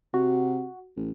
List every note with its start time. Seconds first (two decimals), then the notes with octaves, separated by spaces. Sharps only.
0.14 C3 F#4
0.96 A1